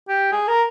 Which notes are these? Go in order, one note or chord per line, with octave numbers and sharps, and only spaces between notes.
G4
G#4
A#4